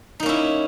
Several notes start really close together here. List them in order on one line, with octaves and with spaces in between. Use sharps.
D#4 A#3 C#4 E4